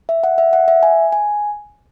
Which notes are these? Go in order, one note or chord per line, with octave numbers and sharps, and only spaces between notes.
E5
F#5
E5
F#5
E5
G#5
G#5